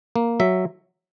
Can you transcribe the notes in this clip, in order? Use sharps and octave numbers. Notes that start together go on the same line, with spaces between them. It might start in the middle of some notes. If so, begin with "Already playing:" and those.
A#3
F#3 E5